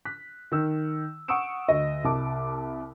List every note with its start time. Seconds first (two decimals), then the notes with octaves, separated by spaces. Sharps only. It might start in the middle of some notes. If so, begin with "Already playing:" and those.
0.05 F#6 B6
0.52 D#3 E6
1.28 F#5 C#6 D#6 E6 D7 E7
1.69 D2 D#5
2.04 C2 A5 D6